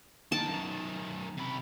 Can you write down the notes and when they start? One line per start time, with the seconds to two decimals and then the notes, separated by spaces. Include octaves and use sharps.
0.32 D#4 G5 A5
0.47 F#2 D#3
1.37 C3 B5